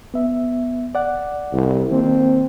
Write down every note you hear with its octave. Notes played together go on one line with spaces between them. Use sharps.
B3 E5
D5 F#5
C2
D#3 A#3 C4